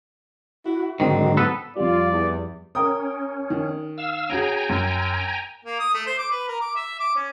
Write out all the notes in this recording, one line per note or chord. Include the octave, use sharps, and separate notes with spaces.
E4 F#4
G#2 D3 D#3 F#3 C4
B3 A4 B4
F2 G3 F4 D5
E2
C#4 A#4 G5 D#6
D#3
F5 E6
C#4 F#4 G#4 G5 G#5 A#5
F#2
A#3
D#6
A3
C5
D6
B4
A#4
D6
E5
D6
C#4